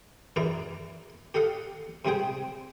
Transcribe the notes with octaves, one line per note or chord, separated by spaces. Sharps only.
F#2 E3 G#3 E4 D5 A#5
G4 A4 D#5 F5 F#5
G#2 C3 G3 C4 G#4 G5